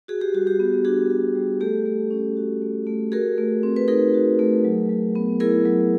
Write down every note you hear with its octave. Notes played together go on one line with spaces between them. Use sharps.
F#4 G#4
G4
G3 F#4
G4
B3
D4 F#4 G#4
F#4
G3
A3 G4 A4
A3
C#4
F#4
A3
A3
F#4 G#4 A#4
A3
C4
B4
D#4 G#4 A#4
F#4
A3
F#3
F#3
B3
E4 G#4 A#4
F#3